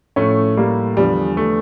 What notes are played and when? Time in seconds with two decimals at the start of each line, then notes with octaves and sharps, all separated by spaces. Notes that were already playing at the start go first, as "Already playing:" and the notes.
0.16 A2 F3 A3 C#4
0.57 G3 A#3
0.97 E2 D3 F3 G3
1.37 A3